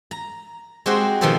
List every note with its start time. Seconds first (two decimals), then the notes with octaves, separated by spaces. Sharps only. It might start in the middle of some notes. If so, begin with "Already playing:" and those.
0.11 A#5
0.86 G#3 C4 F#4 G4 C5
1.21 B2 D#3 F3 G4 A4 C5